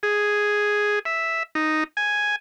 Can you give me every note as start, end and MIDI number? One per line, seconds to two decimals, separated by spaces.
0.03 0.99 68
1.05 1.43 76
1.55 1.84 63
1.97 2.36 80